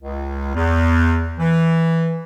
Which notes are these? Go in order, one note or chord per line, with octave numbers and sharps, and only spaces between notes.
C#2
E2
E3